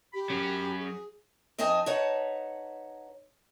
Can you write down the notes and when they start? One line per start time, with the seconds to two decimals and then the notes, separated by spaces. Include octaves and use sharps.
0.14 G4 B5
0.30 F#3 C#4
0.80 G#4
1.58 F2 D#4 D#5 G#5 A5
1.86 D#4 B4 C#5 F#5 A5